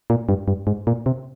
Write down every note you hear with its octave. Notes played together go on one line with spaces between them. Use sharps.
A#2
G2
G2
G#2
A#2
C3